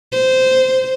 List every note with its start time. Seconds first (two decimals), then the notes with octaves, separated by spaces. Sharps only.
0.12 C5